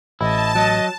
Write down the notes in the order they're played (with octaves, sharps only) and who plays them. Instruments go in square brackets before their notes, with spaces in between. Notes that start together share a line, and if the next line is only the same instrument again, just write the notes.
[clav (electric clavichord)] A1 [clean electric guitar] E4 [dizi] D#5 [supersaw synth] A5
[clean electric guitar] F#3 [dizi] D#5